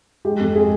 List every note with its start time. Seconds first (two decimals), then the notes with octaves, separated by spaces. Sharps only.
0.25 G#3 G4
0.40 F2
0.55 G#3 G#4